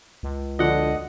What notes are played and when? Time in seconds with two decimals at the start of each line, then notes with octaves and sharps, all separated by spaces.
0.23 C#2
0.59 D3 F3 D4 F#4 D#5 F#5